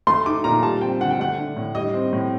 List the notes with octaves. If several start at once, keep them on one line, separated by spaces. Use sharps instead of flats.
A3 C6
D#4 D6
A#2 A#5
G3 A5
C4 G5
D3 F#5
G5
A3 F#5
D4
A2
G3 D#5
C4
A2